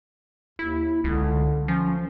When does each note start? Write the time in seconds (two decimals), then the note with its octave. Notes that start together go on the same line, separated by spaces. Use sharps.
0.59 D#2 E4
1.04 C#2 D3
1.68 F3 C#4